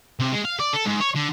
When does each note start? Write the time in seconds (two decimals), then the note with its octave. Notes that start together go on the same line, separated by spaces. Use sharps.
0.20 C3
0.32 G#3
0.45 F5
0.60 D5
0.73 A4
0.86 G#2
1.01 C#5
1.16 D3